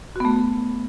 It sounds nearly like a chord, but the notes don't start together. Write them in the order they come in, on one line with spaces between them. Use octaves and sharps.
F#4 B3 A3